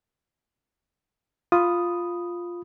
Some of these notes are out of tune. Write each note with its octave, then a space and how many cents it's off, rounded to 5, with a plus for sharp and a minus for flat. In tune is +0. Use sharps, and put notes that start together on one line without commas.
F4 +0 B5 +0 D#6 +0